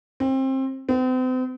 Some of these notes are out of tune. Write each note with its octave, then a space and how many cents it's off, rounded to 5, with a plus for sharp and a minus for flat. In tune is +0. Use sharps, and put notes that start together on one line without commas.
C4 +25
C4 -40